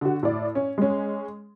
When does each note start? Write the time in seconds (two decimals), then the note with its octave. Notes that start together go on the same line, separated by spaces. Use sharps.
0.01 D3 F#4
0.23 A2 D5
0.55 C#4
0.78 G#3 C#4